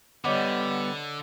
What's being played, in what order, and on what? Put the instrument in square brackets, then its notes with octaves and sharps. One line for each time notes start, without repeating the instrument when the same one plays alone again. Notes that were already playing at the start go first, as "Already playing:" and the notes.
[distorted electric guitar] D3 [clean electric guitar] G3 B3 [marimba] C#5 D#5 D6